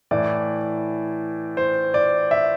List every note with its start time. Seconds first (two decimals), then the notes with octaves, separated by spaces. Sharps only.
0.11 A2 E3 D5
1.57 C5
1.94 D5
2.31 E5